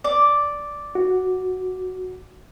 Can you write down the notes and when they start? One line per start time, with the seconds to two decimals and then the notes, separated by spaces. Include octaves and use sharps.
0.04 D5
0.95 F#4